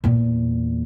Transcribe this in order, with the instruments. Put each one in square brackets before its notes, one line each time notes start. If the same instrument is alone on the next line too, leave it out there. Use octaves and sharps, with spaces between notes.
[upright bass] E2 A#2